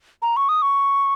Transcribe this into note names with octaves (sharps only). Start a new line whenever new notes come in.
A#5
C#6
D#6
C#6